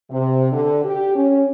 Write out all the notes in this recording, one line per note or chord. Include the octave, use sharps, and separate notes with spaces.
C3
D3
G4
C#4